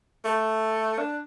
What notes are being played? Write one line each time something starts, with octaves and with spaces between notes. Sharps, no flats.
A3
D4